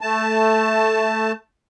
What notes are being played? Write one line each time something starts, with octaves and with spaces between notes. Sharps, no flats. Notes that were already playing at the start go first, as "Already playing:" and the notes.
A3 A5